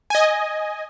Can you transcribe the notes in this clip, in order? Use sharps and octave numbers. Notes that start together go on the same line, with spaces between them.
D#5 G#5